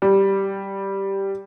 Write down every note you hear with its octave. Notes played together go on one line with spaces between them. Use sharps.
G3